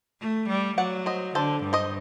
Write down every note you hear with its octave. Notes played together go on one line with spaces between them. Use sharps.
A3
G3
F#3 D5 F#5
C5 D#5
D3 A4 C5
G2
C5 D#5